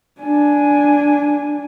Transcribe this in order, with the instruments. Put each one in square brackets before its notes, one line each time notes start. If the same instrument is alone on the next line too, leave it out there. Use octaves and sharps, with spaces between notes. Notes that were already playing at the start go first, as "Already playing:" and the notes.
[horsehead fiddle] D4 G#5